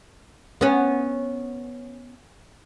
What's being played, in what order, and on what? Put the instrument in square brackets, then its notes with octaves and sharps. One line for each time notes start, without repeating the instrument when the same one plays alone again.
[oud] B3 C#4